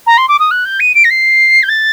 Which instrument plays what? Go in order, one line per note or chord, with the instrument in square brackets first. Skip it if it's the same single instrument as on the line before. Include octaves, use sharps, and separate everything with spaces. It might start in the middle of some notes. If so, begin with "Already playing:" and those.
[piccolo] A#5
C6
D6
D#6
F#6
G6
D#7
D7
A#6
C7
G6
A6